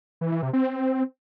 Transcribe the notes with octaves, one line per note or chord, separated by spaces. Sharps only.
E3
E3
C3
C4